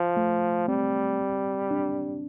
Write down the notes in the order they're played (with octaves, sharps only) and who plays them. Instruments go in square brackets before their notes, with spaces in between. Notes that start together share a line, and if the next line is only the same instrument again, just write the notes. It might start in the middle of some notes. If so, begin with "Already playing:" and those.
Already playing: [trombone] F3
[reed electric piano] A3
[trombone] G3 [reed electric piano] C4
[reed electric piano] D4